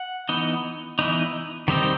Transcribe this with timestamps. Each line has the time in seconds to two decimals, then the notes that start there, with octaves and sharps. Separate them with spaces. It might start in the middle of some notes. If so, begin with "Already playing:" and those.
Already playing: F#5
0.29 E3 B3 D#4
0.99 E3 B3 D#4
1.68 D#3 G3 C4 D#4